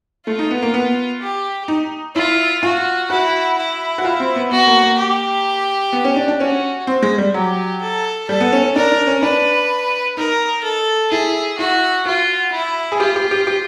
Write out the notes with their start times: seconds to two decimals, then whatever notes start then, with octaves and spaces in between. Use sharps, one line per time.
0.27 A3 F4
0.39 D#4
0.51 B3
0.62 A#3
0.74 B3
1.22 G4
1.68 D#4
2.15 E4 F4
2.63 F4 F#4
3.10 E4 F#4
3.57 E4
3.98 F#4
4.05 F4
4.20 C4
4.36 B3
4.51 B3 F#4
4.67 A#3
4.83 A#3
4.98 G4
5.93 B3
6.04 C#4
6.16 D4
6.28 D4
6.39 C#4 F#4
6.87 C4
7.02 G#3
7.18 G3
7.34 F#3 G4
7.82 A4
8.29 G3 A4
8.40 B3
8.52 C#4
8.64 C#4
8.76 D4 A#4
8.92 D4
9.07 C#4
9.23 D4 B4
10.17 D#4 A#4
10.64 A4
11.11 E4 G#4
11.58 E4 F#4
12.06 F4 F#4
12.52 E4
12.92 G#4
13.00 F4 G4
13.16 G4
13.31 G4
13.47 G4